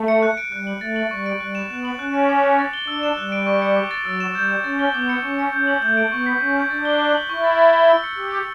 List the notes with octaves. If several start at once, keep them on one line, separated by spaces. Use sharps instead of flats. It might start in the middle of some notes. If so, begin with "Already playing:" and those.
Already playing: A3
C#7
F#6
D7
G3 F#6
F#7
A3 A6
F#7
G3 C#6
D7
G3 F#6
E7
B3 F#6
F#7
C#4 F#6
D7
D6
C#7
A6
G7
D4 E6
E7
G3 F#6
D7
C#6
C#7
D6
A6
F#3 E6
E7
G3 G6
E7
C#4 A6
G7
B3 D6
C#7
C#4 C#6
C#7
C#4 G6
F#7
A3 G6
D7
B3 C#6
B6
C#4 C#6
G6
D4 A6
G7
F#6
F#7
E4 C#6
A6
A6
G7
E6
C#7
G4 E6
C#7